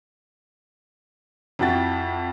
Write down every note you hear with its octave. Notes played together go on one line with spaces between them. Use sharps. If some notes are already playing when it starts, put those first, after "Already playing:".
F2 E4 F#4 G5 A6